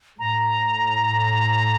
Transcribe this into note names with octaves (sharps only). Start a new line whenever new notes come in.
A2 A#5